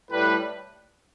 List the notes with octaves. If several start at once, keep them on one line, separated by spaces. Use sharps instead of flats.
A2 G3 B4